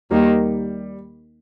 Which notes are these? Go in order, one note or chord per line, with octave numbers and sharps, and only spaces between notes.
D#2 D#3 G3 A#3